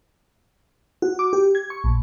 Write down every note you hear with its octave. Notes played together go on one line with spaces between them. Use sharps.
F#4
D6
G4
G#6
C#6
A#1